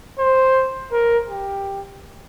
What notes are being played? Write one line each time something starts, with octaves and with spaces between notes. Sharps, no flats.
C5
A#4
G4